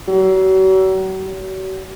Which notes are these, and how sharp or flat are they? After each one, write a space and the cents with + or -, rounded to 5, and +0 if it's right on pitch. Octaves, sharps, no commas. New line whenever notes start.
F#3 +40
F#3 +40